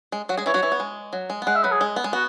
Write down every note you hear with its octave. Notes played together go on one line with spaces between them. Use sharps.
G#3
F#3 F#4
G#3 G#4
E3 E4 C#5
F#3 F#4
E3 E4
B3
G#3
F#3
G#3
B3
G#3 F#5
E5
F#3 B4
G#4
G#3
B3
G#3
B3 F#4